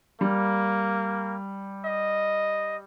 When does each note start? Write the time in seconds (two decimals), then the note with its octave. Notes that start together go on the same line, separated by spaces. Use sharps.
0.21 G3 A#3
1.86 D#5